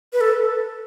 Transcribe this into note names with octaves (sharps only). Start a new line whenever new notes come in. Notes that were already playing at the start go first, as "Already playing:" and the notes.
B4
A4